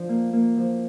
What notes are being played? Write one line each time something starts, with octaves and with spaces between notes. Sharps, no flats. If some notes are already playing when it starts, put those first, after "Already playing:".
Already playing: F3 D4
A#3
A#3
F3